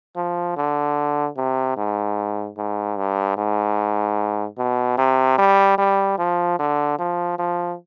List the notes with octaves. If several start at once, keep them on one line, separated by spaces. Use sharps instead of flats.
F3
D3
C3
G#2
G#2
G2
G#2
B2
C3
G3
G3
F3
D3
F3
F3